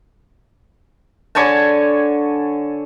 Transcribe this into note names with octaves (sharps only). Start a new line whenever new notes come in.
D3 C#5 G#5 A5